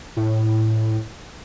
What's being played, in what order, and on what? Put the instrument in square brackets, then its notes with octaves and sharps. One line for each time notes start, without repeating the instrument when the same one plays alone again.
[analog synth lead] A2